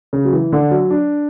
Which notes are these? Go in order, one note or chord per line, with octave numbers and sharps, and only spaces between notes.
C#3
F#3
E3
D3
F#3
D4